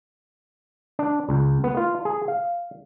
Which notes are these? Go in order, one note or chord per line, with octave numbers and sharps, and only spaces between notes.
D4
C#2
B3
F4
G#4
F5